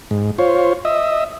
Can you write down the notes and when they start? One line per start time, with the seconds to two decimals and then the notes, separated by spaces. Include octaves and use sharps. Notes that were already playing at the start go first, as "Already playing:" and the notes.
0.11 G#2
0.38 F4 C5 C#5
0.85 D#5 E5